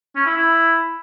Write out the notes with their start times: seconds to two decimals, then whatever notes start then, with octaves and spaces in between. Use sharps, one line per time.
0.16 C#4
0.26 E4
0.36 E4